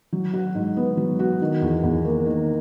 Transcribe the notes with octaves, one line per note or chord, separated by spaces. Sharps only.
F#3
F#4
G#2
B3
F#3
F#4
D#3
E2
E2
A#3
D#3